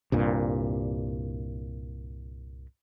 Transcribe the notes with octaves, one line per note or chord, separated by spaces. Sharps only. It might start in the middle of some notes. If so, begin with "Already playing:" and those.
C2 G2 A#2